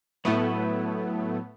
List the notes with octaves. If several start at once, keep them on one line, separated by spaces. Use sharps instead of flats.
A2 F#3 A3 B3 E4 B4